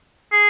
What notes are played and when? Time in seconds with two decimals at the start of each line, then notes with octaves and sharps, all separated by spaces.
0.32 G#4